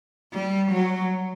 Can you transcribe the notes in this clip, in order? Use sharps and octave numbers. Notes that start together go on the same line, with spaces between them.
G3
F#3